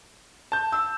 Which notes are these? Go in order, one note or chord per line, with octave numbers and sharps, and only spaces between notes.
A5 G6
E6